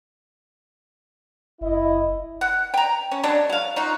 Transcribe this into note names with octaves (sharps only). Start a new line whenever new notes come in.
F#1 E4 D#5
F#5
G5 A#5
C#4
F#3 G#3 D4
F#3 F5
D#4 F4 F#4